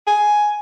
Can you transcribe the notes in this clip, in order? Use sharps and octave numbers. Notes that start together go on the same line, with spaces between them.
G#5